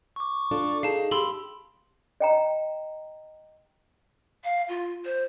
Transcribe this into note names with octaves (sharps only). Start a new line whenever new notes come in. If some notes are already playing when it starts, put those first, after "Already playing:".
C#6 D6
D4 F4 A4
D#4 G#4 F5 A5
G4 B5 C6 E6
D#5 G5 A#5
F5
F4
C5